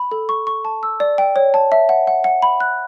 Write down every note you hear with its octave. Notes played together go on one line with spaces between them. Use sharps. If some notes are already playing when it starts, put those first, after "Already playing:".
Already playing: B5
A4
C#6
C#6
A5
E6
D5
G5
C#5
A5
E5
F#5
F#5
F#5
B5
F#6